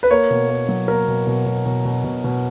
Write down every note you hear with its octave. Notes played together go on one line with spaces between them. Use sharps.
B4
A#3 C#5
B2
A#3
F#3
A#3 A#4
B2
B2
B2
B2
B2
B2
B2